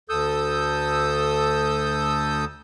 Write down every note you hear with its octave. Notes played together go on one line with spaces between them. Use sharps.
D2 A4 D#6 E6 G6